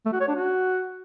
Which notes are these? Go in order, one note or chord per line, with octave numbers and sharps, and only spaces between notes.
A3
F#4
C#5
D4
F#4